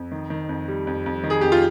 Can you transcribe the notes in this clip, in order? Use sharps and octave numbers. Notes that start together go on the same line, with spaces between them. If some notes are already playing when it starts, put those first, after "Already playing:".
Already playing: F2
D#3
D#3
F2
G3
F2
F2
D#3
G#4
F2 G4
F4